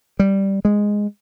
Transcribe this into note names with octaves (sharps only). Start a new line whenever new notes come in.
G3
G#3